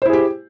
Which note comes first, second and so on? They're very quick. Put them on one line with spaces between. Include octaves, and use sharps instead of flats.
C5 E4 G#4 G4